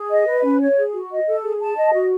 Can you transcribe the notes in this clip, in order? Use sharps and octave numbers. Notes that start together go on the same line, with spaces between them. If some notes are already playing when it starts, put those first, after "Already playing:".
Already playing: G#4
D#5
B4
C#4
C#5
G#4
F#4
D#5
A4
G#4
A5
D#5
F#4